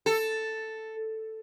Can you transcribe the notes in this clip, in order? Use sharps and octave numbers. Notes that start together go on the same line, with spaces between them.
A4